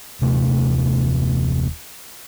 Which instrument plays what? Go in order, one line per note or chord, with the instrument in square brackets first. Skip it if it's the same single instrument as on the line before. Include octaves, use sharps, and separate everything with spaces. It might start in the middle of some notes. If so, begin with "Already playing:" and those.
[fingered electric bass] D#1 C3 A3